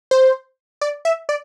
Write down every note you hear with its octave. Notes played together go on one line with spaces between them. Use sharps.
C5
D5
E5
D5